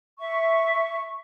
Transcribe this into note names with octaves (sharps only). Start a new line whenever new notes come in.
E5 C#6